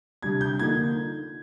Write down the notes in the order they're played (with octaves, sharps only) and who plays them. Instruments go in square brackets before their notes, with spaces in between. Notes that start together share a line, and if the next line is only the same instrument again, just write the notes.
[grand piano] C3 G3 D4 G#6
G6
D3 F3 A#3 D#4 G#6